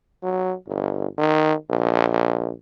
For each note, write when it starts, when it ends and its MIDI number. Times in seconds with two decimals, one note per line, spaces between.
0.23 0.54 54
0.67 1.07 31
1.18 1.54 51
1.70 2.52 34